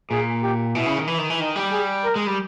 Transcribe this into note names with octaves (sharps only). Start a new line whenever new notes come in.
A#2 G#4
G4
B2 E4
C#3
D#3
E3
D#3
E3
D#3 D#4
G3
G#4
A#4
G#3
G3